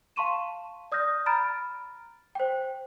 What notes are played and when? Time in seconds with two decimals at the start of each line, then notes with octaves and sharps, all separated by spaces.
0.16 F5 A5 C6 C#6 D#7 E7
0.92 D5 D#6 F6 G6 A#6
1.26 A#5 B5 F6 A6 D7
2.35 C5 G5